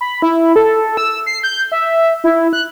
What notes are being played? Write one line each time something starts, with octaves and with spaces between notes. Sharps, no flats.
B5
E4
A4
E6
C7
G6
E5
E4
F#6